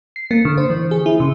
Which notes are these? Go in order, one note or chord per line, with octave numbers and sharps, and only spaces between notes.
C7
A#3
D3
C5
E3
G#4
E4
C#3